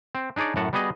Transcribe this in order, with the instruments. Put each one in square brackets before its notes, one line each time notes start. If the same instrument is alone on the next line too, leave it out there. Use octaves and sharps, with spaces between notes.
[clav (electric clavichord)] C4
D4 D#4 G#4 C#5 D5
F#2 A2 F#4 F#5 A5
G3 B3 F#4 G#4 D#5